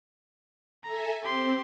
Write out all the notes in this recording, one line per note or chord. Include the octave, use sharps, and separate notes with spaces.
A4 E5 G#5 A#5
C4 G4 C6